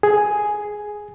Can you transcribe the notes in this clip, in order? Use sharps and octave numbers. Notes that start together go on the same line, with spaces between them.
G#4